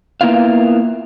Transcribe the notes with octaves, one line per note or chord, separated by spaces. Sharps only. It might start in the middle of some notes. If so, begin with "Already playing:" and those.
A#3 B3 E4 F4 F5